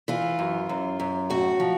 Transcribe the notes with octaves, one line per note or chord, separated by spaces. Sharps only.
E3 F4
F#2
F#2
F#2
A2 F#4
F3